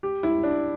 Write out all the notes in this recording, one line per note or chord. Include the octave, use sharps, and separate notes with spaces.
G4
E4
D4